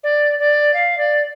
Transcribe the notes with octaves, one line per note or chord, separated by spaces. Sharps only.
D5
D5
F5
D5